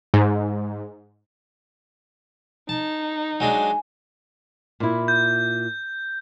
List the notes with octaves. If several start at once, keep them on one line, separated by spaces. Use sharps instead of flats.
G#2
D#4 A5
F#3 G#3 D4 G#5
A#2 E4
G6